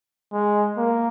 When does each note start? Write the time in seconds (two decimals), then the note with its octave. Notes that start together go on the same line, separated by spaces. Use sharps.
0.33 G#3
0.77 A#3